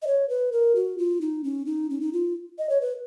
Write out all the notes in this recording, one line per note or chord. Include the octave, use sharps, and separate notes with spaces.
D#5
C#5
B4
A#4
F#4
F4
D#4
C#4
D#4
C#4
D#4
F4
D#5
C#5
B4